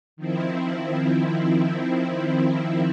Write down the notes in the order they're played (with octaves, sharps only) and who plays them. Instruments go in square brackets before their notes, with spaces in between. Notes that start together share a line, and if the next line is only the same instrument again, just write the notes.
[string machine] D#3 F3 C4 E4